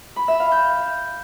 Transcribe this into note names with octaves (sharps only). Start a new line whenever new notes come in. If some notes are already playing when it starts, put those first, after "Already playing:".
B5
E5
F5
G6